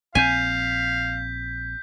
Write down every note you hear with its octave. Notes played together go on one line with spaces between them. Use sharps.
A#1 C4 F5 G#5 G6 B6